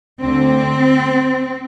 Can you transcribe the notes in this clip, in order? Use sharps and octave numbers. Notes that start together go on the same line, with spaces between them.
D2 D3 C4